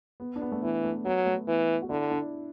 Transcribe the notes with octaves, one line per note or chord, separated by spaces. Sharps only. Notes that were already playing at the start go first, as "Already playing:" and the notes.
B3
D4
B3
A3
E3 B3
A3
F#3 B3
A3
E3 B3
F#4
D3 E4
D4